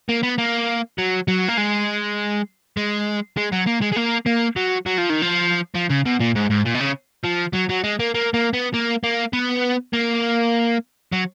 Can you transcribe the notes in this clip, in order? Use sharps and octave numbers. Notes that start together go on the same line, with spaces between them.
A#3
B3
A#3
F#3
F#3
A#3
G#3
G#3
G#3
F#3
A#3
G#3
G#3
A#3
A#3
F#3
F#3
F3
D#3
F3
F3
C#3
B2
A#2
G#2
G#2
A#2
B2
C#3
F3
F#3
F#3
G#3
A#3
A#3
A#3
B3
A#3
A#3
B3
A#3
F#3